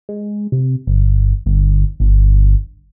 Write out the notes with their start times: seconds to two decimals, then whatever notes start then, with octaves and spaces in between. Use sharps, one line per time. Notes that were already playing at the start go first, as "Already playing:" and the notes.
0.09 G#3
0.52 C3
0.87 G1
1.46 G1
2.00 G1